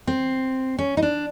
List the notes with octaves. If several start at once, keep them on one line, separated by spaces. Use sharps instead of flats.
C4
C#4
D#4
D4